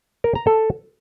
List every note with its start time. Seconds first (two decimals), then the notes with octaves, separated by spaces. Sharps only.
0.24 A#4
0.35 A#5
0.47 A4